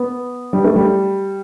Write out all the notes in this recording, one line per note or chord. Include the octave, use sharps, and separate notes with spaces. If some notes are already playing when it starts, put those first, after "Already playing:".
Already playing: B3
G3
A3
G3